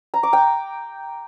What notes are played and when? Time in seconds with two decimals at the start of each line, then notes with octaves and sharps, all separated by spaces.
0.14 A#5
0.23 D6
0.33 G5